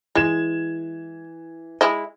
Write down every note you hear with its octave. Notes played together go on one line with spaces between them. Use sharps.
E3 G#3 G#6 E7
G#3 E4 D#5